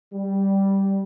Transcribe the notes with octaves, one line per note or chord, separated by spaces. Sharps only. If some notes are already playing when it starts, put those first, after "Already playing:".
G3